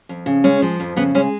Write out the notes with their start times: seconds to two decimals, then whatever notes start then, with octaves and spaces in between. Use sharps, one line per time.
0.09 F2
0.26 C#3
0.44 G#3 C#4
0.62 F3
0.80 F2
0.96 C#3 B3
1.15 G#3 C#4